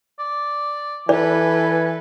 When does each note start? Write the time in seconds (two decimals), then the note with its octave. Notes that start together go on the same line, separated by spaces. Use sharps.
0.19 D5
1.09 E3 A4 B4 D5 G#5